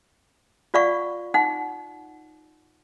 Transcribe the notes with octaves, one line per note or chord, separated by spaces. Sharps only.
F4 D5 F5 F#5 C#6
D#4 F#5